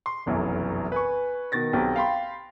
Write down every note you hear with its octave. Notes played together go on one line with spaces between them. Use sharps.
C6
F1 B1 F#2 E3
B4 G#5 C#6
B2 D#3 A6 A#6
B1 C4 G4
F5 G5 B5 C6